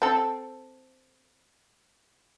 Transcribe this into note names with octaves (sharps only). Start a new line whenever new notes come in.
C4 A4